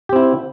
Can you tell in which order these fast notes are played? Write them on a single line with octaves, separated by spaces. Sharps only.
G4 C4 E4